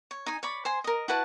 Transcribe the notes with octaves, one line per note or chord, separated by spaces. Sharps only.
C#5
D#4 G#5
C#5 D5 B5
C5 G#5 C6
A#4 D#5
E4 F#4 B4 A5